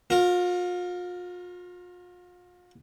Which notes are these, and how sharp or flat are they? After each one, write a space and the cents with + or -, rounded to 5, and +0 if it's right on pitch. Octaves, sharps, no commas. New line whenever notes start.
F4 +40 A#4 +0